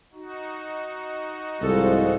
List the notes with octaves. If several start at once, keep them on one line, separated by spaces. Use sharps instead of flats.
D#4 F#4
C2 G#2 F3 G#3 A4